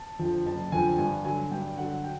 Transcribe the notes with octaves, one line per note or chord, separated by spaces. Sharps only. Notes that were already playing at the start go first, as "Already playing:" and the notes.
Already playing: A5
F2 D3 F3
F#1 A5
F2 D3 F3 G#5
G2 G#5
D3 F#3 G#5
G2 G5
D3 F#3 F#5
G5